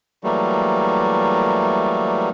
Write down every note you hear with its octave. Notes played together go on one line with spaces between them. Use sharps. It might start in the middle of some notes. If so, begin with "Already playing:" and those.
E3 F#3 G3 A3 A#3